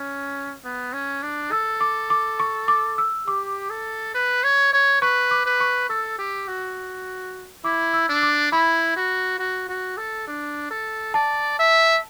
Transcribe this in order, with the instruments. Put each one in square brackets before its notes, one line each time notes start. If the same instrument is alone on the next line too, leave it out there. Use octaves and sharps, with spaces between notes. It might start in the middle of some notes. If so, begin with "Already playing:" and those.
Already playing: [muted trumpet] C#4
B3
C#4
D4
[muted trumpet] A4 [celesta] E6
[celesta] D6
D6
C#6
D6
E6
[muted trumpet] G4 [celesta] D6
[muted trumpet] A4
B4
C#5
C#5
[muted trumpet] B4 [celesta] C#6
[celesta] D6
[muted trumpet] B4
[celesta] C#6
[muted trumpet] A4 [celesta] E6
[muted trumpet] G4
F#4
[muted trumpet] E4 [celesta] D6
[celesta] E6
[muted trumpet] D4
[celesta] D6
[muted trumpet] E4 [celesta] B5
[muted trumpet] F#4
F#4
F#4
A4
D4
A4
[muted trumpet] D5 [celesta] A5
[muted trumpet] E5